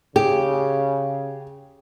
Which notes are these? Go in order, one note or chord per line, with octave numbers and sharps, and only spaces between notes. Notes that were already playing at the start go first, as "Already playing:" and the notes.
C#3 G4 G#4